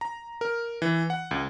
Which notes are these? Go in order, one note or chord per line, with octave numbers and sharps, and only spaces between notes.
A#5
A#4
E3
F#5
C#2